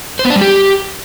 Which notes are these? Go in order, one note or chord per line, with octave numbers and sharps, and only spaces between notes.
C5
B3
D4
G3
G4